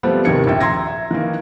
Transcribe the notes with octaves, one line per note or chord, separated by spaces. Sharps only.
F3 G3 A3 B3 C4
D#2 C3 D#3 G4 G#6 C#7
A#1 E5 G5
A#5 C6 E6 G#6 A#6
E5
D#3 E3 A#3